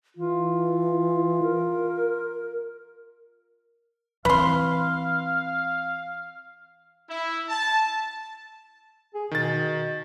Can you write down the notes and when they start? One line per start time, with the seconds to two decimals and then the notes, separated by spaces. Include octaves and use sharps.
0.17 E3 F4
1.43 A#4
4.25 E3 C4 B4 F5 C6
7.09 E4
7.49 A5
9.15 G#4
9.31 B2 D#3 A6